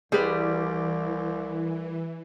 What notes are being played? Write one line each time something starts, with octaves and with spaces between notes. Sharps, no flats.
C2 E3 G3 G#4 B4